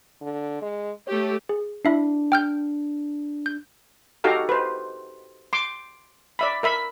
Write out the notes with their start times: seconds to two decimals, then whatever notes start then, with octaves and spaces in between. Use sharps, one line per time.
0.21 D3
0.62 G#3
1.07 A3 G4 C#5
1.49 G#4
1.85 D4 E4 E5 C7
2.32 G5 F6 G6
3.46 G6
4.24 D#4 F#4 G4 A4 F5 A#5
4.49 B4 C5
5.53 C6 D6
6.39 D5 E5 B5
6.63 A#4 E5 B5